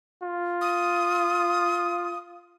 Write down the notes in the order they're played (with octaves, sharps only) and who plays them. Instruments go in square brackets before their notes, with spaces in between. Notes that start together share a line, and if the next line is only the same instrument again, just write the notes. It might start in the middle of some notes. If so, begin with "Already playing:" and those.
[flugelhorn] F4
[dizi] D#6